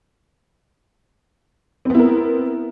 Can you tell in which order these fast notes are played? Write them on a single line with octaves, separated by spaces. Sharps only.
C4 B3 E4 A#4